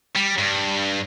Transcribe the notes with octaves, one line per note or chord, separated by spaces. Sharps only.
G3
G2